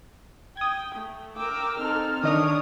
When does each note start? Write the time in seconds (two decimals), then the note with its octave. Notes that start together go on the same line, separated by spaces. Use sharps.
0.57 G5 D#6 G#6
0.95 A3
1.36 A#4 G5 D6 E6
1.78 C4 D#4 A4 F6
2.24 D#3 D4 C#5 D#5 D#6 F6